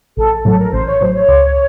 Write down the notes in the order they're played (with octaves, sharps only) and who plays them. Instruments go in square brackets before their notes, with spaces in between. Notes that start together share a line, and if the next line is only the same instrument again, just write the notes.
[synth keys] A1 [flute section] A4
[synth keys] A2 F#3 [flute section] A4
[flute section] A#4
[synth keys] A1 [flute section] C5
[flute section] C#5
[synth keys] A2 F#3 [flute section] C5
[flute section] C#5
[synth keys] C#2